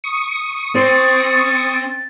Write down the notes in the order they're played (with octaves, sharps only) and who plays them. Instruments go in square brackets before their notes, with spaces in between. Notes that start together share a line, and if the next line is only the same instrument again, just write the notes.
[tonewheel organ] C#6 D#6
[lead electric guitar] C4 [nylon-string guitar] C5 [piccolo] A6